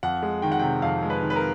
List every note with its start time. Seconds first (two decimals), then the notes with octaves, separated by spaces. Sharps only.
0.03 F2 F#5
0.23 G#3
0.42 D#3 G5
0.52 F#5
0.59 G5
0.62 C3
0.82 F2 F5
1.03 G#3
1.10 B4
1.23 D#3
1.30 B4
1.36 A#4